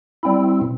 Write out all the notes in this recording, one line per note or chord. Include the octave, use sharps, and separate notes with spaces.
G3 C4 E4
B2